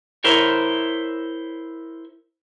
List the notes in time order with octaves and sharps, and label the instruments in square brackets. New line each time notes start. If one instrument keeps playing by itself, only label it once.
[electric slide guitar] E4 A#4 C5 C#5